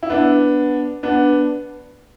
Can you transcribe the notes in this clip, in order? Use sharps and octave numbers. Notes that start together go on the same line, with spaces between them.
E4
B3 D4
B3 D4